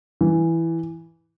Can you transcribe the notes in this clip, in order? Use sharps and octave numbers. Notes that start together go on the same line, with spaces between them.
E3